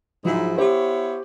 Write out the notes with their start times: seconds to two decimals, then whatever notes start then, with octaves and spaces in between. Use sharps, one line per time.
0.25 G#2 F3 F#3 E4
0.58 B3 E4 G4 C5 C#5